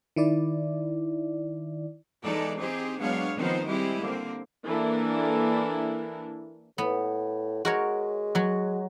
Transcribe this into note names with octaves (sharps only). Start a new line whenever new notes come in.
D#3 E4 D5
E2 E3 G#3 D#4 A4 D5
C4 D#4 G4 G#4
F#3 G#3 B3 D4 C#5 F5
D#3 F3 B3 C4 D#4 C5
G3 G#3 C4 E4 G4
D3 A#3 C4
E3 A#3 D4 E4 A4 A#4
A2 B3
G#3 F#4 A#4 C#5
F#3 F#4